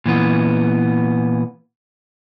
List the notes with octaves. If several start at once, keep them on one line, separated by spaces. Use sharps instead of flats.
A#2 E3 B3